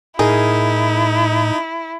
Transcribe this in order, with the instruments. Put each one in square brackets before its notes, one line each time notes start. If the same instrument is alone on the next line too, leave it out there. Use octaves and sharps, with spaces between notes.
[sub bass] A2 [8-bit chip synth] D#4 [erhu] E4 [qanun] G#4 A#4